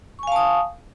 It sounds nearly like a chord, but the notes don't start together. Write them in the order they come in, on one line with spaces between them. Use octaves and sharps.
C#6 G#5 F5 A5 D#6